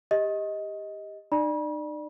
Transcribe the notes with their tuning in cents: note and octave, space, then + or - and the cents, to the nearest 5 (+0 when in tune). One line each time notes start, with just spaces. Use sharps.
G4 +20 D#5 +15
D#4 -40 D5 +20 B5 -45